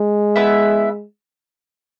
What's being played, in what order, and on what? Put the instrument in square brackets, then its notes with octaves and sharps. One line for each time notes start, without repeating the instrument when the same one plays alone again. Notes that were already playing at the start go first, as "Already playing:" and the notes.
Already playing: [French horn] G#3
[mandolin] B3 E4 B4 E5